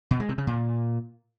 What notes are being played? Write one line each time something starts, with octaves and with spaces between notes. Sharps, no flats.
B2
G#3
C3
C#3
A#2